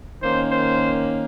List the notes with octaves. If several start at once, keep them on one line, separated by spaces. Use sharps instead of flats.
D#3 A#3 C#4 C5
C5